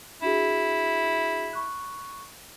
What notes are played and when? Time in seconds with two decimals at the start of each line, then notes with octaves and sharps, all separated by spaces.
0.22 D4 E4 F#4 G#4
1.53 B5 C#6 F#6